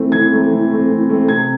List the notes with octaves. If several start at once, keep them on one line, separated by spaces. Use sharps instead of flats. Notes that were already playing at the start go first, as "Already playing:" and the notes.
Already playing: E3 A3 C4
E3 G#6
A3 C4
E3
A3 C4
E3
A3 C4
C3 G#6